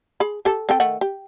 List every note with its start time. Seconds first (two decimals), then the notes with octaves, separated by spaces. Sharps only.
0.20 G#4 B5
0.45 G4 A4
0.69 C4 A4 G5
0.80 D#3 A3 F#5
1.01 G4